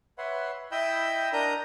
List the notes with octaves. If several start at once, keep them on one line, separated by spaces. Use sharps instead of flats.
B4 C#5 E5 F#5 C6
E4 D#5 G5 B5 E6 G6
D4 A#4 A#5 D#6 G6